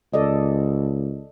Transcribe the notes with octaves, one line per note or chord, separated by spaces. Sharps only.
C#2 A4 D5 D#5